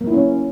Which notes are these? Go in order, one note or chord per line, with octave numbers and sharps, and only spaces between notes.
A#3
E4
C#4